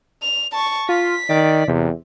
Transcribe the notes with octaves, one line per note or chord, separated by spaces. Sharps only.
F7
A5 C#6
F4 B6
D#3 D5
E2 C3